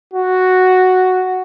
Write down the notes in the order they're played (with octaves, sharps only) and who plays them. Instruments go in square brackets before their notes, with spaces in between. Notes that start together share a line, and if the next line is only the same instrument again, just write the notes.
[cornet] F#4